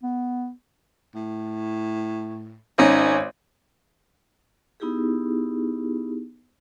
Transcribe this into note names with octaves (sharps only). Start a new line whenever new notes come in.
B3
A2
G#1 C#4 D#4
B3 D#4 E4 G4 G#4